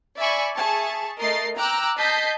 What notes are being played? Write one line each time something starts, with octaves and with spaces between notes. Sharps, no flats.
D5 E5 G#5 B5 C#6
G#4 E5 A5 C#6
A3 A#4 D#5 A6 C7
G5 A#5 D6 E6 F#6
D#5 A5 G6 B6 C7